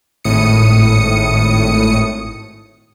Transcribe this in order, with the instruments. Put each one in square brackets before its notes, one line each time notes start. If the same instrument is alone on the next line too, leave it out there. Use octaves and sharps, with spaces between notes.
[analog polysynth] G#1 A2 D#6 C#7